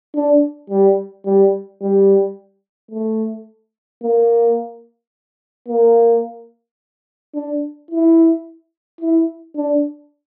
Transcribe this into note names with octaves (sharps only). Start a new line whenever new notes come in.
D4
G3
G3
G3
A3
A#3
A#3
D4
E4
E4
D4